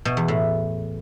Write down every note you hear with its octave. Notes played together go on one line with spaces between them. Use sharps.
B2
E2
A2